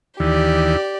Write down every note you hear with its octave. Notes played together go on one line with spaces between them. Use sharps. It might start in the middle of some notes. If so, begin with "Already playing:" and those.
D#2 E3 G4 D5